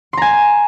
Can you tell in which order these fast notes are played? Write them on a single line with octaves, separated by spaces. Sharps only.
C6 A#5 G#5